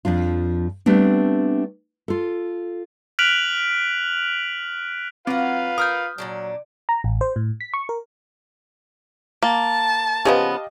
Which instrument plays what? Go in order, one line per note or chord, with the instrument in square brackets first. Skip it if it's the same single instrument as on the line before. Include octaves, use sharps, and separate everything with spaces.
[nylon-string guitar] F2 F3 D4 F4
G3 A3 B3 C4 D4
F4 A4
[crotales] F6 F#6 B6 D7 F7 F#7
[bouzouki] F#3 F#5 [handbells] C4 [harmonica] F4 B4 [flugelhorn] F5
[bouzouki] A#4 [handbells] D#6 F6 G6
[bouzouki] A#2 C#3 D4 [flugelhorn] F#3
[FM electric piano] A#5
A1
C5
A2
B6
C#6
A#4
[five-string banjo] A#3 [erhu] A5
[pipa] C#3 F3 B3 [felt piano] G4 D#5 F5